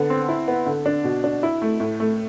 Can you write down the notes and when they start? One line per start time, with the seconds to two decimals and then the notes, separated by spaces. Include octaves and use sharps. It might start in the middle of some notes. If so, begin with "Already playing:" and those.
Already playing: D3 B3
0.10 C4
0.29 E4
0.48 B3
0.66 D3
0.86 D4
1.04 B2
1.24 D4
1.43 E4
1.62 A3
1.80 A2
2.00 A3